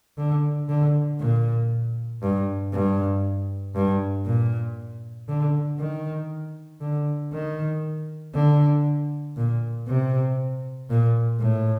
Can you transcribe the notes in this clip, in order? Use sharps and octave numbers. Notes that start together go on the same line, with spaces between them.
D3
D3
A#2
G2
G2
G2
A#2
D3
D#3
D3
D#3
D3
A#2
C3
A#2
A2